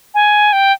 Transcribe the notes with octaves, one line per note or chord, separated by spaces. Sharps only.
G#5
G5